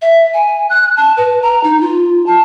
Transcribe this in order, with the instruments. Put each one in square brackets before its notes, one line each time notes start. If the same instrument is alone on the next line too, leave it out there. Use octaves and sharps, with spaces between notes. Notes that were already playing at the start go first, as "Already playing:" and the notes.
[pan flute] E5
G#5
F#6
A5
B4
A#5
D#4
F4
A5